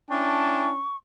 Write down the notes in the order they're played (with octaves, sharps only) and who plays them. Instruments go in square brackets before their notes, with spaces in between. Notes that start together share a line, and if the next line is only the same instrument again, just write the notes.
[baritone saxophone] C#4 [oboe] D4 [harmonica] E4 G5 A5 [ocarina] C#6